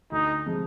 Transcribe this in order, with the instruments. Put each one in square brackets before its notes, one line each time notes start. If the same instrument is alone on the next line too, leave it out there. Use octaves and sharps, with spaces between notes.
[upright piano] D2 [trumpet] D#4
[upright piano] C3 F3 G#3